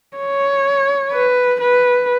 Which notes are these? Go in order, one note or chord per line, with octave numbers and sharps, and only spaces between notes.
C#5
B4
B4